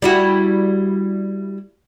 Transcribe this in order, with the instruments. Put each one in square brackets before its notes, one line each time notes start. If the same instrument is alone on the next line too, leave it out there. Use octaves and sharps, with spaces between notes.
[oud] G3 E4 F#4